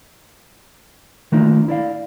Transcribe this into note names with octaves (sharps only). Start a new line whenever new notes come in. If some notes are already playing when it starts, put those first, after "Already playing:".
D#3 A3 A#3 D4 D#4 F4
E4 D5 F5